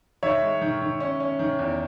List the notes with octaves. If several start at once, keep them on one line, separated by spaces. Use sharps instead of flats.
D#3 C#5 E5
G#3
D#3
D#3
C#4
C#4
D#3
E2